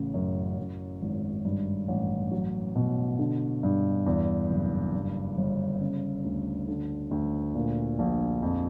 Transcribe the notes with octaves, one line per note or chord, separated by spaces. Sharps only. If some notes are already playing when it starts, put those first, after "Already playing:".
Already playing: A1 C#3
F#2
F#2
G#1
G2
A1
F#3
B2
D3
G2
E2
F#1
G2
G1
C#3
D2
D3
D2
A#2
A#1
F2